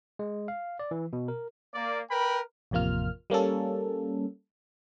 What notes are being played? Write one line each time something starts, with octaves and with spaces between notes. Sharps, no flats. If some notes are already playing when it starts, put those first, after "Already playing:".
G#3
F5
D5
E3
B2
A#4
A#3 D5
A#4 B4 G5 B5
A1 F2 C3 A#3 F4 F6
G3 A#3 C#4 A4